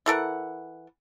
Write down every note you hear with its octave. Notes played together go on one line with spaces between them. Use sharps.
E3 A4 A#4 F#5